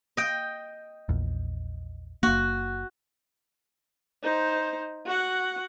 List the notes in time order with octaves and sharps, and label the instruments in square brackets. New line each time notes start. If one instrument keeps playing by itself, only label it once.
[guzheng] D#5 G5
[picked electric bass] A#1 E2
[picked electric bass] F#1 A#3 [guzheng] F#4
[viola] D#4 C5
F#4 F#5